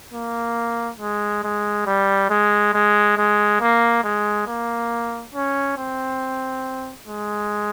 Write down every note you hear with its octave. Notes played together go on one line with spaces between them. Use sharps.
A#3
G#3
G#3
G3
G#3
G#3
G#3
A#3
G#3
A#3
C#4
C4
G#3